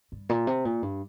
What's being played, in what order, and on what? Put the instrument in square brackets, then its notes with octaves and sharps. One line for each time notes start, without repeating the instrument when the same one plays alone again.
[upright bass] G2
A#2
C3
A#2
G2